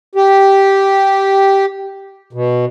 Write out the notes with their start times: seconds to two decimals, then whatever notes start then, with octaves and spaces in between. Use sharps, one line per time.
0.15 G4
2.33 B2